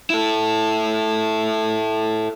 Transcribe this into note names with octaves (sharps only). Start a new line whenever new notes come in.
E4 A4